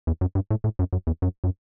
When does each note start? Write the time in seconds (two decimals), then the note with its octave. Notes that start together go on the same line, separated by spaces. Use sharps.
0.07 E2
0.21 F#2
0.35 G2
0.51 A2
0.64 A2
0.79 F#2
0.93 F#2
1.07 E2
1.22 F#2
1.44 F#2